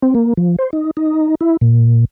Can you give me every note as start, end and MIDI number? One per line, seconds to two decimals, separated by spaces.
0.02 0.14 60
0.15 0.33 58
0.37 0.56 53
0.59 0.70 72
0.73 0.91 63
0.97 1.35 63
1.41 1.57 64
1.61 2.05 46